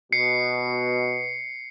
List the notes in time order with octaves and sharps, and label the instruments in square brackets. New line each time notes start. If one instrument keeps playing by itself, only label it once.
[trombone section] B2 [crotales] C7 C#7